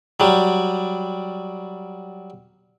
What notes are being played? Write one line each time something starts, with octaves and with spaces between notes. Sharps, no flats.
F#3 G3